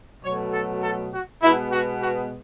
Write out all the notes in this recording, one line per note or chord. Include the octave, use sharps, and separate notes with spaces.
B2 F#3 A3 C#5
A4
A4
F#4
B2 G#3 B3 E4
F#4
F#4